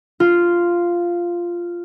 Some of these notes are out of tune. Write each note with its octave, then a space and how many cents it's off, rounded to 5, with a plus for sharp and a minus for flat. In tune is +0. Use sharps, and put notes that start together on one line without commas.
F4 -5